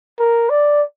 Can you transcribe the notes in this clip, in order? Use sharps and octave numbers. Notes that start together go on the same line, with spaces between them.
A#4
D5